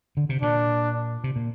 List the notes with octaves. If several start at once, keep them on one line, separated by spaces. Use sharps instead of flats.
D3
C3
A#2 D4
C3
A#2